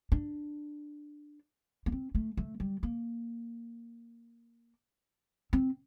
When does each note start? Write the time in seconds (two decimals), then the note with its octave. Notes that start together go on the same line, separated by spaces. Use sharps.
0.12 D4
1.86 A#3
1.92 C4
2.15 A3
2.37 A3
2.60 G3
2.83 A#3
5.53 C4